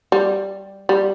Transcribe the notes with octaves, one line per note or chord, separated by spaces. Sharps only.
G3
G3